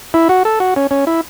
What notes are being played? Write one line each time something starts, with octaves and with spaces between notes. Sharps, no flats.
E4
F#4
A4
F#4
C#4
C#4
E4